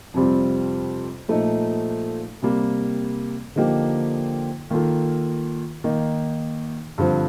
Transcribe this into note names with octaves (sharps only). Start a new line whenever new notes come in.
F2 C3 G3 C4 F4
A#2 F3 A3 D#4
C3 G3 A#3
D3 F3 A#3 D#4 G4
D#3 A#3 F4 A4
D#3 A#3 D#4
G2 D3 F3 C4